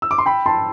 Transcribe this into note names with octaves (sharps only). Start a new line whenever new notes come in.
E6
D6
C6
G5 B5
A5 C6